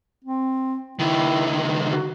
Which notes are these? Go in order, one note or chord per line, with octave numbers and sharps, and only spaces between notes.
C4
C#2 D#3 E4
G3
F#4